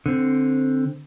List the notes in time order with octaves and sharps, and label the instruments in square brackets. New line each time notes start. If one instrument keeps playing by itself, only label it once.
[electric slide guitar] D3 C4